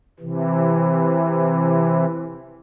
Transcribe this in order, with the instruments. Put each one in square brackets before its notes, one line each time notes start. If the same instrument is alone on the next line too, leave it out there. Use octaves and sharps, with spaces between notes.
[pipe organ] C3 E3